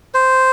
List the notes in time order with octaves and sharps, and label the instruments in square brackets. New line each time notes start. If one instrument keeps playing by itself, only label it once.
[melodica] C5